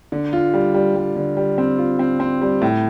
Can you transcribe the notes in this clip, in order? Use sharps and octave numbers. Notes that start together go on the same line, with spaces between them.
D3
F4
G3
G3
G3
D3
G3
C4
F4
C4
C4
G3
A2